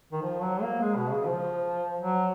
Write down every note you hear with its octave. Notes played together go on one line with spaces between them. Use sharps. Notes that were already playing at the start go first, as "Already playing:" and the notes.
D#3
F3
F#3
A#3
G#3
B2
C#3
F3
F#3